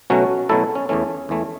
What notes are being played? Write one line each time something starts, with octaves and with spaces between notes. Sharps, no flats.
B2 F#3 A3 C#4 F#4
B2 F#3 A3 E4 A4
C#4
E2 E3 A3 C#4
E2 E3 A3